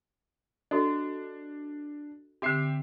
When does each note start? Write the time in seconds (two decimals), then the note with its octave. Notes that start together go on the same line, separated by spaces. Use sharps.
0.71 D4 F#4 A4 D#5
2.42 D3 C4 G4 E5 C7